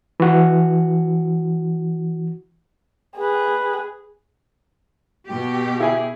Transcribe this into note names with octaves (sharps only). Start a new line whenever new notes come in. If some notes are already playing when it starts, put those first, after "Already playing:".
E3 F#4
G#4 B4
B2 G4
E4 G#4